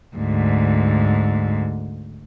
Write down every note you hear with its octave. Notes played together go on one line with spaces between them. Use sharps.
D2 G#2